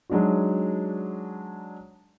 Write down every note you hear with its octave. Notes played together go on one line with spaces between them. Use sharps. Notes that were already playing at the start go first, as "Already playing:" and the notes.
F#3 G#3 D4 D#4 F#4